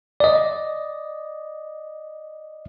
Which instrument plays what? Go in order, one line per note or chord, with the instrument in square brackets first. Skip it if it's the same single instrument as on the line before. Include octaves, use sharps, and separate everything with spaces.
[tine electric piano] D5 D#5